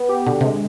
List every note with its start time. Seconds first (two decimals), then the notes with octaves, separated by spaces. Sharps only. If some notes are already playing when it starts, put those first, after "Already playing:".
Already playing: B3
0.09 G4
0.26 B2 D3
0.41 C3 G#3